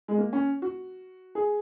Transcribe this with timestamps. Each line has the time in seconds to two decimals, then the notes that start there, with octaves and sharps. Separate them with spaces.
0.08 G#3
0.18 A#3
0.33 C#4
0.62 F#4
1.35 G#4